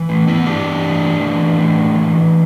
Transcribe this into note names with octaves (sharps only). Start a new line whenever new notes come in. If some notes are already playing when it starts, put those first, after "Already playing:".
Already playing: E3
A2
B3 E4
E3 D4 G4
A2
E3
A2
E3